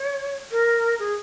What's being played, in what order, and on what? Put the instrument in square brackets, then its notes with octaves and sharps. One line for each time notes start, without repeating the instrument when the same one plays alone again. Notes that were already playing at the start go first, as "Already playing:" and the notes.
Already playing: [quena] C#5
A#4
G#4